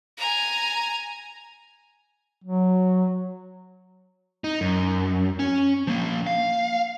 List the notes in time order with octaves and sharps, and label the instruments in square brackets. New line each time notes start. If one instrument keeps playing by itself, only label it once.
[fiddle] G#5 A#5
[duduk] F#3
[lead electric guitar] D#4
F#2
C#4
F3 A#3
F5